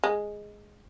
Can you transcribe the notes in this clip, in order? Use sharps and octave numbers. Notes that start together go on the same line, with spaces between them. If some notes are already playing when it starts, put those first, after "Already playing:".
G#3